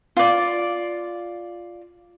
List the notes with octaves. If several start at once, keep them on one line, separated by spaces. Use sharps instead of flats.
F4 D5